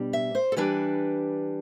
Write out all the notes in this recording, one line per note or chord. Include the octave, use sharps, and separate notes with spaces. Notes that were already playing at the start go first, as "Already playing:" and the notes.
Already playing: B2 G3 D4
E5
C5
A4
E3 G3 D4 B4